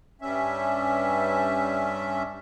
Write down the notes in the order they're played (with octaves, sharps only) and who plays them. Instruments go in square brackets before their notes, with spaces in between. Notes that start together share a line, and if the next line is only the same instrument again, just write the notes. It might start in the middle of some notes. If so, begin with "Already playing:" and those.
[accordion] G2 G3 C#4 E5